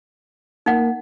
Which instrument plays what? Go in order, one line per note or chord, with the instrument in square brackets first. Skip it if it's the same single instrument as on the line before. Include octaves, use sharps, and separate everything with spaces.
[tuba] A#3 [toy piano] D#4 F#5